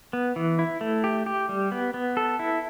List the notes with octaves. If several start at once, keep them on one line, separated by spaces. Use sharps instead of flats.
B3
E3
E4
A3
G4
G4
G3
B3
B3
A4
E4